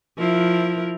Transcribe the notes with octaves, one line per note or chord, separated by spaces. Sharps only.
F3 E4 A#4